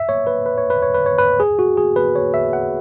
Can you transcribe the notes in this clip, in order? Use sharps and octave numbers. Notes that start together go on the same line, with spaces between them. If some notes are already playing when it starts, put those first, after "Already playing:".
Already playing: E5
C#5
B4
B4
C#5
B4
C#5
B4
C#5
B4
G#4
F#4
G#4
B4
C#5
E5
F#5